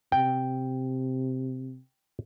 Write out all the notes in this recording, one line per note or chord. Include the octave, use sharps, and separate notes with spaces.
C3 G5